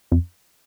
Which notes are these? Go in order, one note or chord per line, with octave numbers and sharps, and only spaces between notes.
F2